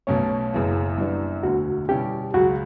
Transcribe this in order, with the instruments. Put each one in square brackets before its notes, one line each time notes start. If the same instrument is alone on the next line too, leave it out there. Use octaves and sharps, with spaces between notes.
[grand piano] B1 B2 F#3 A3 C#4 [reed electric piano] C#5
[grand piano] F#1 F#2 C#3 E3 B3
F#2 E3 G3 B3 D4
[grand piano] E1 D2 D3 [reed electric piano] F#4
[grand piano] B2 G3 C#4 E4 [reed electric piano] G4
[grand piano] C#2 C#3 F#3 [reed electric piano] F#4